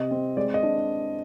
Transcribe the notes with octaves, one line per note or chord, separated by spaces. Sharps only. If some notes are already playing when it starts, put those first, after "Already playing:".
Already playing: C3 C4 D#5
C4
G#3 D5
D#5
D4